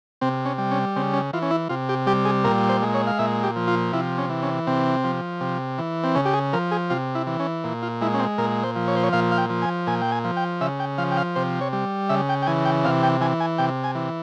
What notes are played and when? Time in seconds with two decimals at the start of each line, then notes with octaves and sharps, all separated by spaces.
0.21 C3 C4
0.45 C#4
0.58 G3
0.71 C#4
0.96 C#3 C4
1.14 C#4
1.33 E3 F4
1.42 C#4
1.51 E4
1.69 C3 F4
1.89 G4
2.06 G3 G4
2.25 G#4
2.44 A#2 A#4
2.69 C5
2.82 G#3
2.94 C#5
3.07 F5
3.19 A#2 E5
3.43 G4
3.56 F3
3.67 F4
3.93 C3 E4
4.18 C#4
4.30 E3
4.42 C#4
4.67 C3 C4
5.04 F3
5.41 C3
5.78 E3
6.04 C4
6.15 C#3 C#4
6.25 G4
6.34 G#4
6.53 F3 A#4
6.71 G#4
6.90 C3 F4
7.15 E4
7.27 E3
7.39 C#4
7.64 A#2
7.82 F4
8.01 G#3 E4
8.14 C#4
8.19 C4
8.38 A#2 A#4
8.63 C5
8.76 F3
8.88 C#5
8.96 C5
9.04 C#5
9.13 A#2 F5
9.32 F5
9.38 G5
9.50 F3
9.62 G#5
9.87 A#2 G#5
10.02 G5
10.11 G#5
10.25 F3
10.37 G5
10.61 C#3 E5
10.80 G5
10.98 F3 F5
11.12 G5
11.17 F5
11.35 C3 C5
11.61 C#5
11.73 G3
12.09 C#3 E5
12.29 G5
12.42 G5
12.46 E3 G#5
12.65 G5
12.85 C3 F5
13.03 G5
13.21 E3 G#5
13.40 G#5
13.58 C3 G5
13.84 G#5
13.95 E3